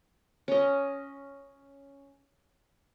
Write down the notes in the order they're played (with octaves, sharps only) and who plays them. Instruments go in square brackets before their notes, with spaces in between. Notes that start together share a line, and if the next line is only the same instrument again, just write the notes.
[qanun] C#4 D#5